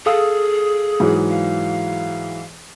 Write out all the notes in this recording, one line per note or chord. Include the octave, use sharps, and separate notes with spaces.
G#4 A4 F5 D#6
G#2 E3 F#3
F5